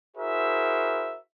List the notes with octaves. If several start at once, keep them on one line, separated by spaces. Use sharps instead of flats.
E4 F#4 G#4 A#4 C5 E5